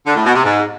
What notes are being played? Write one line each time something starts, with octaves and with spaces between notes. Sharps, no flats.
D3
A2
B2
C3
G#2